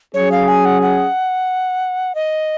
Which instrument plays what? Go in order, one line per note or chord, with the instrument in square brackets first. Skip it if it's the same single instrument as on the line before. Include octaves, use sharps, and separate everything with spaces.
[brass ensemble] F#3 C#4 G#4 [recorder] C#5
[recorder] F5
G#5
F#5
F#5
D#5